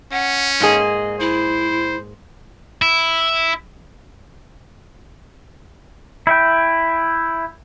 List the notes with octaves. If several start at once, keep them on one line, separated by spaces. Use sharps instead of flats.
C#4 F#5
G#2 A#3 G#4 D#5
E4 C5
E4
E4 E5 G5